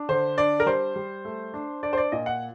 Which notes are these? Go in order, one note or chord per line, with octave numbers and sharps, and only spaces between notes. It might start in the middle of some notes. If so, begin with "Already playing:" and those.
Already playing: D4
D3 C5
D4 D5
A#4
G3 C5
G3
A3
D4
D4 D5
C5
D5
A#2 D#5
F#5